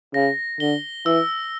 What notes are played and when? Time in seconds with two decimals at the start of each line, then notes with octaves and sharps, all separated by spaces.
0.14 C#3 A#6
0.60 D3 G7
1.05 E3 E6